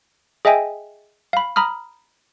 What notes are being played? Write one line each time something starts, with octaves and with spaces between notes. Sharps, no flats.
G#4 D#5 E5 G5 G#5
F5 B5
A#5 B5 D#6 F6